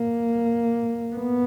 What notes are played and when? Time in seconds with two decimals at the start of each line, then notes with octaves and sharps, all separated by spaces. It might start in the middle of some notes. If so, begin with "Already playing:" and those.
Already playing: A#3
1.15 B3